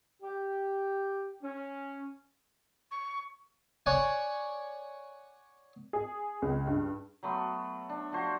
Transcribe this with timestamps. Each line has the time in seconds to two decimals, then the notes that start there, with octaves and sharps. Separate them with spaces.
0.21 G4
1.43 C#4
2.91 C#6
3.86 C#5 D5 F#5 G#5
5.93 G#4
6.42 C#2
6.67 G2
7.23 F#3 A3 B3 C6
7.89 D4
8.12 F3 F#4 C5